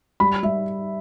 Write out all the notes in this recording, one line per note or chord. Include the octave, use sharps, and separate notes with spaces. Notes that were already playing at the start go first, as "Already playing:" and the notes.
G3 B5
G3 E5